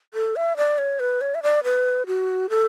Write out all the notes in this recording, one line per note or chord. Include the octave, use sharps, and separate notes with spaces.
A4
E5
D5
C#5
B4
C#5
E5
D5
B4
F#4
A4